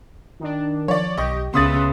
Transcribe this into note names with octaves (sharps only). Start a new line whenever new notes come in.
D#3 D4
F3 C#5 D5
B1 G4 D#5 C#6
C#2 C#3 B3 B4 E5 C6 D#6 A6